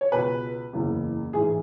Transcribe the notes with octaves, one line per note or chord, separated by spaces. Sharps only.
C#5
C#2 B2 B4
F#1 E2 C#3
A1 G#2 E3 G#4